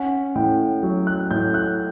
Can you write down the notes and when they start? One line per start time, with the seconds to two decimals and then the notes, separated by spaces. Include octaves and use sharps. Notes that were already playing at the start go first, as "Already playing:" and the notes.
Already playing: C#4 F#5
0.35 A2 G5
0.83 F#3
1.07 F#6
1.31 A2 G6
1.54 F#6